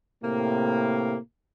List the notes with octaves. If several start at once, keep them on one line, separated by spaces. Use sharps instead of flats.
A2 C3 A#3